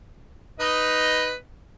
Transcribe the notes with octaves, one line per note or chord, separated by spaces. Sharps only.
D#4 B4 D#5